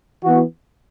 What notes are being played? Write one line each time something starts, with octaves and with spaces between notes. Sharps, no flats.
E3 B3 F#4